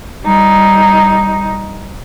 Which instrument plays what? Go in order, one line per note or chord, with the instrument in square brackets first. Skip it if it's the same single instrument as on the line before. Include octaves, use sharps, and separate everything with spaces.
[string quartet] G3 D#4